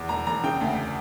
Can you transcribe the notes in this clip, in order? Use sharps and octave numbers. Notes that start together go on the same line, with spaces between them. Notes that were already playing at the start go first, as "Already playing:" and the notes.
Already playing: E2
E1 A#5
E1 A#5
C#3 G5
D2